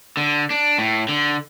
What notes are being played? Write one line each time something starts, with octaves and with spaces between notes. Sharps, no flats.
D3
D4
A2
D3